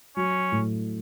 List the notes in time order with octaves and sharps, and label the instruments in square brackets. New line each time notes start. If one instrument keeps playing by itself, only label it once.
[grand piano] F#3 [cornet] C#4
[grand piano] A2